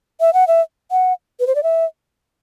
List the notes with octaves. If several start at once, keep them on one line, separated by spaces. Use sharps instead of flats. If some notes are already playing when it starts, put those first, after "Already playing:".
E5
F#5
E5
F#5
B4
C5
D5
E5